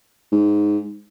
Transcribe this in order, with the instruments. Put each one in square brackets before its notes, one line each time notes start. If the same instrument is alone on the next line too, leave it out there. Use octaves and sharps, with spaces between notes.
[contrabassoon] G#2